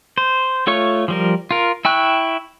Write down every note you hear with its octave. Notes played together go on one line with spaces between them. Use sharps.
C5
A3 F4 C#5 C#6
F3 G3 A#4
F4 A#4
E4 G5 C#6 F#6